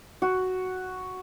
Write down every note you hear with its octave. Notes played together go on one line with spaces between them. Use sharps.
F#4